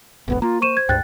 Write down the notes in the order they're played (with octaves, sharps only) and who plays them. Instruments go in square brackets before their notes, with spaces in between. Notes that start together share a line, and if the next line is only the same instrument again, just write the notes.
[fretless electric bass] E1 A#1 A2 [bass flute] B3
[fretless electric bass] A#3 [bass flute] F4 [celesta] A#5
[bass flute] C5 [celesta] C#6 D#7 E7
[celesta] G#6
[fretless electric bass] C#2 G2 [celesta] G5 F#6 A6